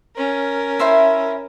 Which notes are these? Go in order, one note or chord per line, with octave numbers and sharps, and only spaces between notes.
C#4 A#4
E4 C5 E5